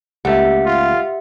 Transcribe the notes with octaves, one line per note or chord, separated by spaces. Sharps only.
C#2 A3 A#3 G4 E5 F#5
F4